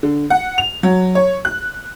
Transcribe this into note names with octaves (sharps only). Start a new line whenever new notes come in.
D3
F#5
F7
F#3
C#5
F#6